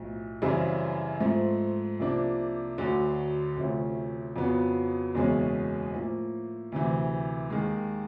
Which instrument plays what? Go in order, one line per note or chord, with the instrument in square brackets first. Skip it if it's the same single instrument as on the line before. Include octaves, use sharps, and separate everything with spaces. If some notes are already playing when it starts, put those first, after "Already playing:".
Already playing: [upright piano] B1 A2 F3
F#2 C#3 E3 G3 C4
G#2 F3 A3 C4
C2 C3 F3 A#3 D4
D2 D3 F#3
D2 C3 F3 A3 C#4
F2 C#3 F#3 B3
F#1 E2 B2 G#3 C#4
A2 F3 A#3
D2 C3 E3
D#2 D#3 G#3